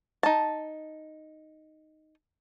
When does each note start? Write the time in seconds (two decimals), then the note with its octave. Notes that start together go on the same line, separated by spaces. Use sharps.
0.23 D#4 A5